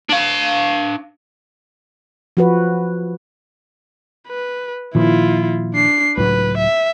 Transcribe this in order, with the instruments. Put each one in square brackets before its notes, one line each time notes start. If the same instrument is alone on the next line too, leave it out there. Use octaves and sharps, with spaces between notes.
[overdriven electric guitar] D4 F5
[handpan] F3 F#4 B4
[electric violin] B4
[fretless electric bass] A#2 D#3 F3 [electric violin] E4 F4
[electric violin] D4 C7
[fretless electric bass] C#2 A2 F#3 [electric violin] B4
[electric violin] E5